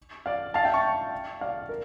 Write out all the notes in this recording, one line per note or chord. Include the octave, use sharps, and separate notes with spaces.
D5 F5
F5 A5
E5 G5
A5 C#6
D5 F5
A#4